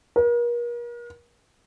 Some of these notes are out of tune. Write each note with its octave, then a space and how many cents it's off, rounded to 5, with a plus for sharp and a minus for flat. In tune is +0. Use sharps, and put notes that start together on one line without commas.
A#4 +40